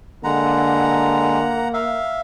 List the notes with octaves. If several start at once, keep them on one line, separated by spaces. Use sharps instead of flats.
D3 G#3 A#3 F#5 A#5
E5 F5